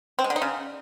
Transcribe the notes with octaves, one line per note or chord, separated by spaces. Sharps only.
C4
G#3
D3
D#4
C#3